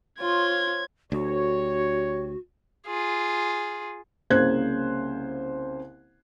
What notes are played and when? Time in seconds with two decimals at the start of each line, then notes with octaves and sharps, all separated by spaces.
0.20 F4 C5 C#5 G#6
1.12 D2 D4 F#4 G4 C#5
2.87 F4 G#4
4.30 C2 C#3 A#3 C5 F#6 G#6